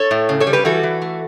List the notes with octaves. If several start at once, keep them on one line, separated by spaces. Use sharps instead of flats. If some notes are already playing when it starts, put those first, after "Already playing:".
Already playing: A4 C#5
A2
C#3
A4 C#5
G3
G4 B4
E3 F#4 A4
E3
A3